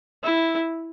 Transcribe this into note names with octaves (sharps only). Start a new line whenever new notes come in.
E4